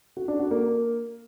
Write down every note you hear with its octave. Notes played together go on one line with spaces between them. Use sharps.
F#4
D4
F#4
A#3